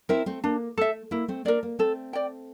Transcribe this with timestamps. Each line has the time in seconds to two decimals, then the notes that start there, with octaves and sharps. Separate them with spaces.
0.09 C4 E4 A#4 E5
0.26 A3 C4
0.44 A#3 D4
0.77 A3 A4 E5
1.11 A#3 E4
1.28 A3 C4
1.45 A#3 D4 A#4 D5
1.63 A#3
1.79 A3 C4 A4
2.13 D5 G5